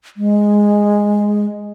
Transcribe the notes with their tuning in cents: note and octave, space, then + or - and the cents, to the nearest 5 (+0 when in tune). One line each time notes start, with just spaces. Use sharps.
G#3 -5